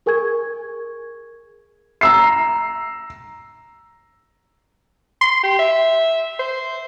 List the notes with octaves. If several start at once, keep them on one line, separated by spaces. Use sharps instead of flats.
G#4 A#4 G#5 C#6 G#6
A#5 E6 C7
C6
G4
E5
C5